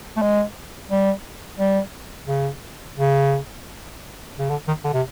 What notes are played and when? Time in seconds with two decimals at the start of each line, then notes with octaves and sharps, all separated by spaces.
0.17 A3
0.22 G#3
0.91 G3
1.59 G3
2.28 C#3
2.96 C#3
4.39 C#3
4.50 D3
4.68 D#3
4.85 D3
4.93 C3